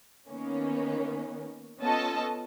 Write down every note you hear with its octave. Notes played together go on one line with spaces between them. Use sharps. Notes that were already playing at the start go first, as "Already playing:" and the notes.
D#3 A#3 B3 C#4
B3 C#4 F4 A4 D#5 A5